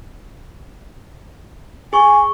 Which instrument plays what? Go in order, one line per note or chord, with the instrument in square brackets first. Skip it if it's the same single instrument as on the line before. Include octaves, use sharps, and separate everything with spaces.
[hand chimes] G#4 C#6 [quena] G#5